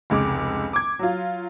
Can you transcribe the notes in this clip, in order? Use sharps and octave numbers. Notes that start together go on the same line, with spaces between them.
F1 C#2 G#3 D6
D6 G#6
F#3 F4